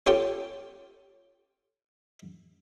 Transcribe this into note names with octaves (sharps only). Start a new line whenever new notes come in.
C#4 F4 G4 A4 G5 A5